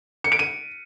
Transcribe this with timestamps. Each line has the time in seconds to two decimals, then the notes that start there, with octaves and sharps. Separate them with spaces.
0.24 C#7
0.32 D7
0.39 D#7